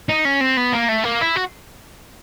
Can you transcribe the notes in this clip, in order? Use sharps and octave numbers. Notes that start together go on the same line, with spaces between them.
D#4
C#4
C4
B3
A#3
A3
A#3
E4
F#4